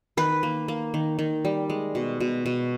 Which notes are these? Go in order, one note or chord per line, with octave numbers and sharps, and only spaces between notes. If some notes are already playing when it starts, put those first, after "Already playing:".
D#3 B4
A#3
A#3
D#3
D#3
G3
G#3
B2
B2
B2